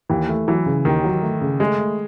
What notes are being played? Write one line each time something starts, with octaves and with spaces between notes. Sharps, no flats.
D#2 E3
A3
E3 F#3
C#3
D#2 D#3
F#3
A3
C#3
G#3 A3
A3